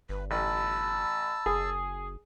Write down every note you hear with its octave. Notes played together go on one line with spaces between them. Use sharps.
G1 B4
A1 A5 B5 E6
F#1 G#4